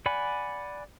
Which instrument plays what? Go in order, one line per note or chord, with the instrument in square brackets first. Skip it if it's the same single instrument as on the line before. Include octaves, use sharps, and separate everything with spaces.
[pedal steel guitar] D5 F#5 G#5 B5